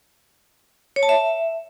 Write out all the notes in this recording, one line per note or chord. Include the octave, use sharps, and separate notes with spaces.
C#5
A5
E5